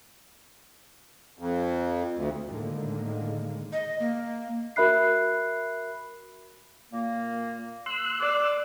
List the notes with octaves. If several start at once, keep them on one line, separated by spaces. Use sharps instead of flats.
F2
D2
A2 D3 D#3 G#3 A#3
D#5
A#3
F#4 A#4 E5 B5 F#6 C7
A#2 A#3
C6 E6 F#6
D5